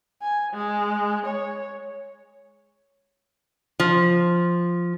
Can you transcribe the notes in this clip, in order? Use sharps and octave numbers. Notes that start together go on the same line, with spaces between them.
G#5
G#3
C#5
F3